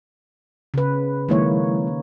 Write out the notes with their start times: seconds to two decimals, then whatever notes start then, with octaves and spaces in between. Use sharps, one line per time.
0.74 C#3 B4
1.29 D#3 F3 G#3 A#3 E4 C#5